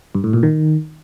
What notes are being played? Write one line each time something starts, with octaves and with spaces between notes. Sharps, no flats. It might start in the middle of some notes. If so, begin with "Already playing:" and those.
G2
A2
A#2
D#3